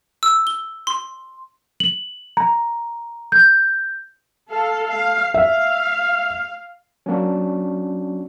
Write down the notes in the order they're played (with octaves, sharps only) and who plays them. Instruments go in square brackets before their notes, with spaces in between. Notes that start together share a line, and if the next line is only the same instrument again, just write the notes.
[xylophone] E6
G7
C6
[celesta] F#7
A#5
G6
[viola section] A4 F5
F5
[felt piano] E5 [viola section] F5
[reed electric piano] F#3 A#3 [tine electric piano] C#4 D4 F#4